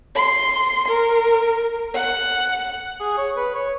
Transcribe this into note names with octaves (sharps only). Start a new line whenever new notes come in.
C6
A#4
F#5
G#4
C#5
B4
C#5